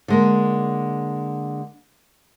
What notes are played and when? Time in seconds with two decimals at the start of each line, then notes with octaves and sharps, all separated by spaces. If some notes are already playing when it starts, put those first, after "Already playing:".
0.08 D3 G#3 A#3